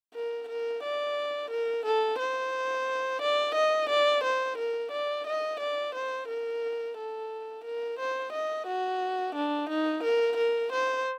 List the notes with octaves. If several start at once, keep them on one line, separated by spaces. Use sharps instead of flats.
A#4
A#4
D5
A#4
A4
C5
D5
D#5
D5
C5
A#4
D5
D#5
D5
C5
A#4
A4
A#4
C5
D#5
F#4
D4
D#4
A#4
A#4
C5